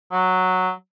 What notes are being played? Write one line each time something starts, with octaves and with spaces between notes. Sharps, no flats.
F#3